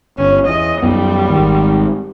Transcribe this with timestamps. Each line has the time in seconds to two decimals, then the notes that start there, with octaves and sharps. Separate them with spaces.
0.18 G1 C#4
0.47 E2 D#5
0.82 F#2 G3 B3
1.29 G#1 D#3